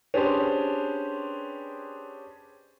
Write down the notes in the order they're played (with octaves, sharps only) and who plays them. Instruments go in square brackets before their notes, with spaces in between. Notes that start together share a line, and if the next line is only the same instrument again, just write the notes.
[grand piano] C#4 D4 G4 G#4 B4 C5